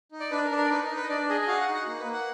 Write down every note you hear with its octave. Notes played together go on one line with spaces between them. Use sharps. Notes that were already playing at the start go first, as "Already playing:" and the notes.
D#4
D5
D4 B4
A#4
D4
A#4
D5
D#4 B4
A#4
D#4
B4
D#5
D4 D5
G#4 D#5
D#5
F#4 F5
F#5
D#4
F#5
A#3
B4
A#3
F#5